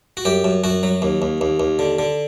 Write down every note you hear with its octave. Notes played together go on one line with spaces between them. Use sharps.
F#4
F#2 G4
F#2
F#2 F#4
F#3
D#2
D#2
D#2
D#2
D3
D3